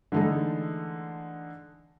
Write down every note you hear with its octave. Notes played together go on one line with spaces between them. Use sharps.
D3 E3 G#3 A3 D#4